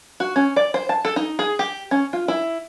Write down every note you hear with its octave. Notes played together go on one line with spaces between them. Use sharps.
F#4
C#4
D5
C5
A5
A4
D#4
G#4
G4
C#4
F4
E4